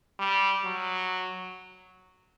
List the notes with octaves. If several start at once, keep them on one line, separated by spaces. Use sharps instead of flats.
G3
F#3